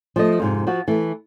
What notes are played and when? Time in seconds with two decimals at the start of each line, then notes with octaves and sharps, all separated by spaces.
0.16 F3 A3 D#5
0.40 F2 G#2 C3
0.67 F3 F#4
0.88 E3 A3